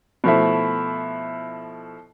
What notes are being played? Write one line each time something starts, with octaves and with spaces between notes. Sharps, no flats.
B2 F3 A3 E4